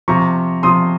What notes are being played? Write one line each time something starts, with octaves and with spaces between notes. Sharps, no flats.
C3 F3 A#5 C#6
C3 F3 C6 D#6